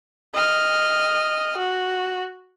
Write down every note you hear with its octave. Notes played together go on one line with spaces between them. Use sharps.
D#5 F6
F#4